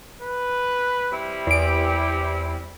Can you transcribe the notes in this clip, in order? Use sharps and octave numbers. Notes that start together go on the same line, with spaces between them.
B4
G3 C4 E4
E2 G4 D7